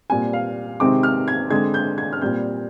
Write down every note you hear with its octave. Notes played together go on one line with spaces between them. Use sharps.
A#2 G3 C4 G#5
F5
C3 D#3 G#3 C4 D6
F6
G#6
D3 G#3 C4 G#6
G6
G#6
F6
A#2 G3 C4 G6